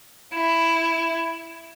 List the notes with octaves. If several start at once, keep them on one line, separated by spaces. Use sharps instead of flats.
E4